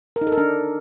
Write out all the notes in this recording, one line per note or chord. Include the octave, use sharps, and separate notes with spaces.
A#4
D#4
A4
A#4
D4